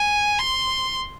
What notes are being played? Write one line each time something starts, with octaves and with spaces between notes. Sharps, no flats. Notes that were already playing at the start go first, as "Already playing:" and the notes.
Already playing: G#5
C6